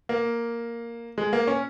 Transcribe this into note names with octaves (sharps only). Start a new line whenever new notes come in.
A#3
G#3
A#3
C#4